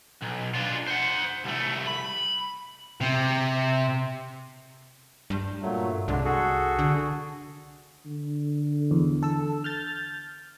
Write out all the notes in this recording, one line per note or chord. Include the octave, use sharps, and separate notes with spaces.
B1
D4 F4
C5 F#5
C2 A3
B5
C3
G2
A#2 F#3 A3
C2 D3 G#3 D4
F#4 G#4 A4
D3
D3
E2
A4 E6
F6 G6 A6